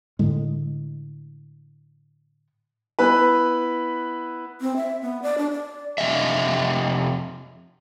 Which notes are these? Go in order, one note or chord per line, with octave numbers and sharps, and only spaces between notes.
A2 D3 G#3
B3 E4 B4
C4
E5
B3
D5
D4
D5
F2 C3 D#3 D#5 E5